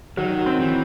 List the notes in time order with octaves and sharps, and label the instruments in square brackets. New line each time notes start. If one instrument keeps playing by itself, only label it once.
[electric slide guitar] D#3 [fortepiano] F#3
[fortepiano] C4
[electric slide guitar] E3